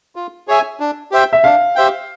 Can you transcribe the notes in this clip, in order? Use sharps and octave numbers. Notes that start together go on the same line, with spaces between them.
F4
G#4 C#5 E5 G#5
D4
G4 C5 E5 G5
E5
D4 F5
G4 C5 E5 G5